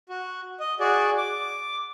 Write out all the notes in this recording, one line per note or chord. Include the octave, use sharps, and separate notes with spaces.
F#4
D#5
F#4 G#4 D5
D6